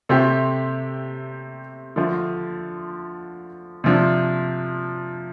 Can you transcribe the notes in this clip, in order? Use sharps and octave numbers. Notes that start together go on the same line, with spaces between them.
C3 A3 C4 G4
D3 F3 A3
C3 F3 D4